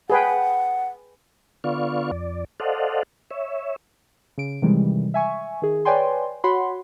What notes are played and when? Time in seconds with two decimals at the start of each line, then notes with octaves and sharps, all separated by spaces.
0.10 G#4 B4 F#5 G5
1.64 D3 B3 F4 D5 F5 C#6
2.12 F2 D5
2.60 A4 C5 D5 D#5 F5 F#5
3.31 C#5 E5
4.38 C#3 D7
4.62 C3 D#3 E3 G3 G#3
5.14 E5 G#5 C#6
5.62 D#3 G#4
5.85 B4 C#5 D5 G5 G#5 C6
6.44 F#4 C#5 F#5 B5 C6